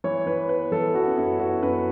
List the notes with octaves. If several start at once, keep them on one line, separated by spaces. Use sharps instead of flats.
E3 C#5
E3 B4
B3 B4
E3 A4
B3 F#4
C#4
F#2 E4
B3 F#4
F#2 B4